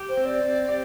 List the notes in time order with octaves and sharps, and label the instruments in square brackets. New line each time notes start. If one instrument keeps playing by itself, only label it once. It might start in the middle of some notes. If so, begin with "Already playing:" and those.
Already playing: [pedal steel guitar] G4
[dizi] C5
[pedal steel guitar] C4
[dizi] D5
[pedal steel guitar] C4
G4